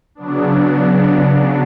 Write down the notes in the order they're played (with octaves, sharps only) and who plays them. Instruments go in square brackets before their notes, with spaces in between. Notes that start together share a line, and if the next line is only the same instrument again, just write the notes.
[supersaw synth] C#3 F#3 B3 D4